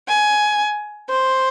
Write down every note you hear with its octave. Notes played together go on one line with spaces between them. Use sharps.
G#5
C5